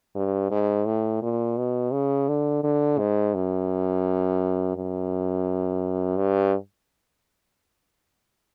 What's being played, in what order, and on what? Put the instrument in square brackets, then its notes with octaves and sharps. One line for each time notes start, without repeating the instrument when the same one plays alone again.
[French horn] G2
G#2
A2
A#2
B2
C#3
D3
D3
G#2
F#2
F#2
G2